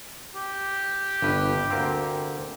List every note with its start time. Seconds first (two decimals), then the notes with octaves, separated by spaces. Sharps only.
0.35 G4
1.22 G1 G2 B4
1.70 D2 A#3 C4